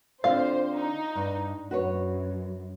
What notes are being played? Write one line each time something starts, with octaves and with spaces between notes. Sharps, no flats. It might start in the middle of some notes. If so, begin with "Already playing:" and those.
D3 C4 F4 C5 F5
D#4
G2
F#2 F#4 B4 C#5